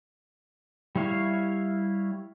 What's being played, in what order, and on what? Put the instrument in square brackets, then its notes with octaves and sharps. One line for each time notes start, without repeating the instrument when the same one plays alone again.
[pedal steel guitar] G3 E4 C#5 F5